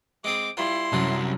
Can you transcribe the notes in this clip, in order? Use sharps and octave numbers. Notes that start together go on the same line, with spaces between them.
G#3 C4 G#4 D6
G3 E4 F4 C6
C2 F#2 F#3 C#4 D4